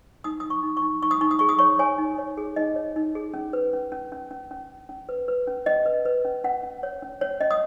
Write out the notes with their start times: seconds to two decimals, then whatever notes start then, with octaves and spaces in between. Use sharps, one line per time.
0.24 D#4 D#6
0.40 D#4 D#6
0.50 C#6
0.63 D#4
0.77 C#6
0.82 D#4
1.02 D#4 C#6
1.11 D#6
1.21 D#4 C#6
1.31 D#6
1.39 G#4 C#6
1.49 D#6
1.59 C#5 C#6
1.79 C#5 G#5
1.98 D#4
2.18 C#5
2.37 G#4
2.56 D#4 D#5
2.76 C#5
2.96 D#4
3.15 G#4
3.34 C#4
3.53 B4
3.73 C#4
3.92 C#4
4.12 C#4
4.31 C#4
4.51 C#4
4.69 C#4
4.89 C#4
5.09 B4
5.28 B4
5.47 C#4
5.66 C#4 D#5
5.86 B4
6.05 B4
6.25 C#4
6.44 C#4 F#5
6.63 C#4
6.83 C#5
7.03 C#4
7.21 C#4 C#5
7.41 C#4 D#5
7.51 D#6